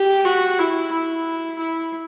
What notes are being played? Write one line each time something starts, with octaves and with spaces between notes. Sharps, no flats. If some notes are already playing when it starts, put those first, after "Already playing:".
Already playing: G4
F#4
E4
E4
E4